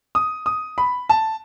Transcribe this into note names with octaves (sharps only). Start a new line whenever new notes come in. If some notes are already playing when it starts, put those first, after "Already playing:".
D#6
D#6
B5
A5